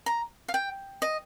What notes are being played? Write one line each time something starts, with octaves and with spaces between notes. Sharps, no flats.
A#5
F5
G5
D#5